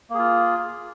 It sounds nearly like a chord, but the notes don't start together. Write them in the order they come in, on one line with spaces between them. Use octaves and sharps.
A#3 G#4 F4